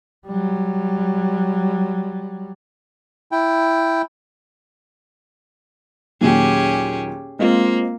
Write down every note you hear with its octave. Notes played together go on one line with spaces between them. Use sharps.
F#3 G3
E4 G5
D#2 A#2 F#3 C#4 G4 G#4
G#3 A#3 C4 F4